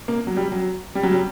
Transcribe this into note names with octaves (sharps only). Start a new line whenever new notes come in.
A#3
F#3
G3
F#3
G3
F#3
G3